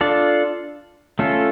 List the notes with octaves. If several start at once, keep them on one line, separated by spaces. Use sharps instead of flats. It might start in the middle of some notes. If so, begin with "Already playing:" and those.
D4 F4 A4 D5
A3 C#4 F4 A4